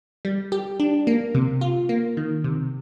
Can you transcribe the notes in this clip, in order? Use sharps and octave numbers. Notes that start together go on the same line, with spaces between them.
G3
G4
D4
A#3
C3
F4
A#3
D#3
C3